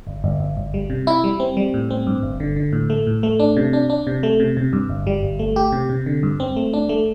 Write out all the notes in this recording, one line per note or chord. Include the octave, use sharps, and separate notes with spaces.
G1
G1
G1
G1
G3
C3
E4
G3
C4
G3
A2
C4
G2
G1
D3
D3
A2
A3
A2
A3
D4
C3
D4
D4
C3
A3
C3
C3
G2
G1
G3
G1
A3
G4
C3
C3
D3
G2
C4
A3
D4
A3